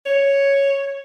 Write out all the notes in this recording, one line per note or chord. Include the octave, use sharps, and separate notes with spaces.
C#5